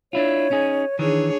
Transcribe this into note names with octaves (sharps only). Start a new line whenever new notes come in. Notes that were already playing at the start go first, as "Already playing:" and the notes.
D4 E4 F4 C#5
C#4 D#4 G#4
D#3 E3 D4 G#4 C#5